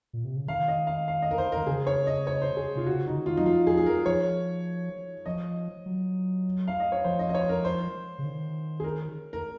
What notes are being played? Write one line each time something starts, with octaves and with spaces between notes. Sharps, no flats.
A#2
C3
C#3
D#3 F5
D#5
F5
F5
D#5
A#4
C5
D#3 A#4
C#3 G#4
C#5
D#5
C#5
C5
G#4
C3 F4
C#3 F#4
C#3 D#4
D#3
F4
F#3 D#4
F3 F4
G#4
G#4
A#4
F3 C#5
F3 D#5
F#3
F5
D#5
C#5
F3 C5
D#5
D#5
C#5
A#4
C5
C#3
D#3
G#4
A#4
A#4